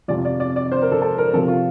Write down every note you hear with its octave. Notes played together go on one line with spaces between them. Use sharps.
F2 C3 F3 D5
D5
D5
D5
C5
A#4
A4
A4
A#4
C3 F3 C4 A4
F4